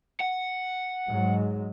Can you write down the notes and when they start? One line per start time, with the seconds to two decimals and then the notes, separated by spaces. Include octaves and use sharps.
0.20 F#5
1.09 G#2 F#3 G#3